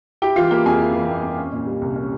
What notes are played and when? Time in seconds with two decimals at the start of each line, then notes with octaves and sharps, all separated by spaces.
0.22 E4 G4 G5
0.36 E3 F4 F5
0.51 A#3 G4 G5
0.66 F2 G#4 G#5
0.79 E4
0.94 E3
1.08 A#3
1.23 F2
1.38 C#4
1.53 A#2
1.67 G3
1.81 C2
1.96 C#4